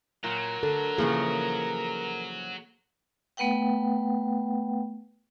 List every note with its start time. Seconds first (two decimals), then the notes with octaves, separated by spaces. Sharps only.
0.24 A#2 F#3 A#4
0.63 D3 A4
0.98 C#3 E3 F3 A#3 G#4
3.37 A3 B3 B4 F#5 G5